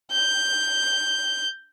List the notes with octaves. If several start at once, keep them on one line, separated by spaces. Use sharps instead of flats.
G6